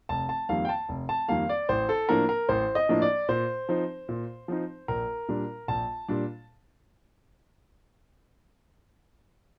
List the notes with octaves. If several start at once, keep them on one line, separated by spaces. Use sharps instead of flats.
F1 A5
A5
F2 D#3 G3 A#3 F5
G5
A5
F1
A5
F2 D#3 G3 A#3 F5
D5
A1 C5
A4
A2 F3 A#3 D4 A#4
A#4
A1 C5
D#5
A2 F3 A#3 D4
D5
A#2 C5
F3 C4 D#4
A#2
F3 C4 D#4
A#1 A#4
A#2 G3 D4
A#1 A5
A#2 G3 D4